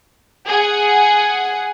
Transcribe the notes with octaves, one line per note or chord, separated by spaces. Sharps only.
G#4 F#5